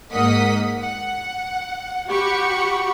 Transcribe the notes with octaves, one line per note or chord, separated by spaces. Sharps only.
G#2 A#3 D#5 F#5 D#6 B6
F#5
F#4 G4 F#5 B5 C#6